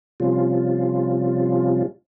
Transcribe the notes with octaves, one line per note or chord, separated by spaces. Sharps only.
C3 F3 G3 C#4 F4